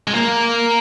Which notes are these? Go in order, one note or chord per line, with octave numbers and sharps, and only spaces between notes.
G#3
A#3